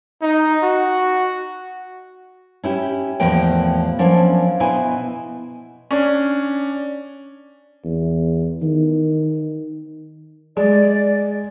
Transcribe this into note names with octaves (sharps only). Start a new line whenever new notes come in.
D#4
F#4
C#4 E4 G4
E2 A2 F3 A#3 G5
F3 F#3 A#3 C#4 D4 E4
B2 E4 C5 G#5
C#4 D4
E2
D#3
G#3 D5